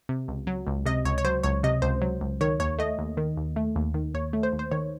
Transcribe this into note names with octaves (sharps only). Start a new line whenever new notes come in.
C3
C#2
F#3
C#2
C3 D#5
C#2 C#5
C#5
F#3 C5
C#2 C#5
C3 D#5
C#2 C5
F#3
C#2
D#3 C#5
D#2 C#5
A3 D#5
D#2
D#3
D#2
A3
D#2
D#3
D#2 C#5
A3
C5
D#2
C5
D#3 C#5